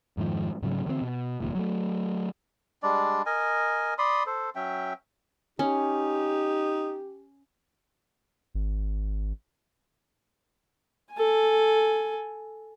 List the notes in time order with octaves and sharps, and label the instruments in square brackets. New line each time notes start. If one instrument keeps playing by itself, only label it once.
[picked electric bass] F2 G#2 D#3 F3
G#2 C#3 F#3 C#4
D3 E3 G3 C4
B2
F1 D#2 A#2
F#3 G3 A3
[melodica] G3 G#3 D4 D5
A#4 D#5 G#5
D5 B5 C6 D#6
A4 C5
F#3 C#4 E5 G5
[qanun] C#4 [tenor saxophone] D#4 [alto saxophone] G4
[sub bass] G#1
[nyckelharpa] A4 G#5